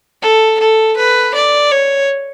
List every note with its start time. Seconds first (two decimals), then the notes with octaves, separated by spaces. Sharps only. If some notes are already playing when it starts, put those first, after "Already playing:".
0.22 A4
0.60 A4
0.97 B4
1.35 D5
1.71 C#5